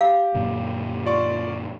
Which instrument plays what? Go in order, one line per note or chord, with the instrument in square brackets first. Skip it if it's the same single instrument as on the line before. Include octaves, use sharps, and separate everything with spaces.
[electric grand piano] G4 [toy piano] F5
[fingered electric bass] F#2 A#2 D3
[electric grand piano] F4 D5 C#6